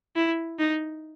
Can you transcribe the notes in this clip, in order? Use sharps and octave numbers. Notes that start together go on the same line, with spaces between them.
E4
D#4